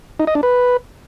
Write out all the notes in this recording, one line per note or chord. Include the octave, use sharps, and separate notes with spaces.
D#4
D#5
D4
B4